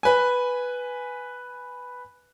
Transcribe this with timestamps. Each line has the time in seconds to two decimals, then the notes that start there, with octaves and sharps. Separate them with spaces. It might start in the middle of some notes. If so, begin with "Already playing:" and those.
0.03 B4 G#5